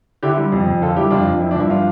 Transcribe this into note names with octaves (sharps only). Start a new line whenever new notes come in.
D3 E4 G4
E4
G3
F2
F2
D3 F4 A4
G3 E4 G4
F2 D4 F4
F2
F3 E4
D4
G2 E4
F3 D4 F4